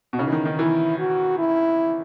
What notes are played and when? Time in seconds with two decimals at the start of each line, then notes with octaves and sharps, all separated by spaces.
0.13 B2
0.18 C#3 D#4
0.27 E3
0.32 D#3
0.45 D#3
0.59 E3 E4
0.98 F#4
1.38 E4